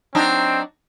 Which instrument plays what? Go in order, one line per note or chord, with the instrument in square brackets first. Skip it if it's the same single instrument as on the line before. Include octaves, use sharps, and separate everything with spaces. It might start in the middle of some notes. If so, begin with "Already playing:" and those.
[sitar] F#3 D4 D#4 [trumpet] C4